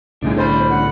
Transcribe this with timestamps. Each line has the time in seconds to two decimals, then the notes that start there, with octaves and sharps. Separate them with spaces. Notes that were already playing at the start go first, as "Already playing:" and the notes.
0.22 C2 A2 D3 D4 D#4 G#4
0.36 A4 C5 D5 B5
0.69 F#5